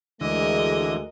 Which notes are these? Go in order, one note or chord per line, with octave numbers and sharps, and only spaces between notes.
D2 D3 E3 G#3 A#4 D#5